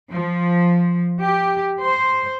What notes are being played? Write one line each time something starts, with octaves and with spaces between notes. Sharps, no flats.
F3
G4
C5